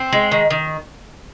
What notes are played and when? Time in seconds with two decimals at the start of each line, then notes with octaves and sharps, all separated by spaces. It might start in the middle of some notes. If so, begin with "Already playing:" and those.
Already playing: C4
0.13 G#3
0.32 D#3
0.50 D#3